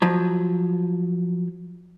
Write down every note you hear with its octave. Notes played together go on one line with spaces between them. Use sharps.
F3 F#3